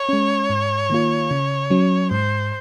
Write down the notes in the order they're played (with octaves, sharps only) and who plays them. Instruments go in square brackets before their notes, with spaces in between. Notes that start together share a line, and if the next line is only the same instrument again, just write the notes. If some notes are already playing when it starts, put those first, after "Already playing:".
Already playing: [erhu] C#5
[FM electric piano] G#3 C#4
G#2
D#3 A#3 F4
C#3
F#3 C#4
[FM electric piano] G#2 [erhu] C5